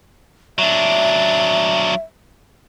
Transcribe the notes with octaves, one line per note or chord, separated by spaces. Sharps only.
F#3 D4 E5